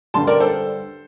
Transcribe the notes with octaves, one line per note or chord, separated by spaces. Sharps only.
G2 D3 G3 A5 C6
A#4 D5
A4 C5